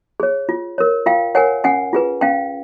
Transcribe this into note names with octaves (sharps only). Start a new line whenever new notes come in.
G#4 C#5
F4
A#4 C#5
F4 F5 G5
A#4 C#5 F#5 G#5
C#4 F#5 G#5
F4 G#4 B4
C#4 F5 G5